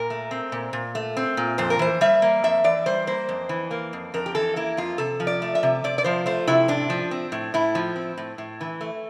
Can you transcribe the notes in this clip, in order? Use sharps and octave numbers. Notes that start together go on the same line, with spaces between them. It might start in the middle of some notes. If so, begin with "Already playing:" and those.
Already playing: A#2 A#4
A3
C4
A#2
A#2
A3
C4
A#2
F2 C5
A#4
E3 C5
G3 E5
A#3
F2 E5
E3 D5
G3 C5
A#3 C5
F2
E3
A#3
F2
F2 A#4
G4
E3 A4
A#3 E4
F2 F4
C3 A4
F3
D5
A3
E5
C3
C3 D5
D5
F3 C5
A3 C5
C3 E4
A2 D4
F3
C4
A2
A2 E4
F3
C4
A2
A2
E3
A3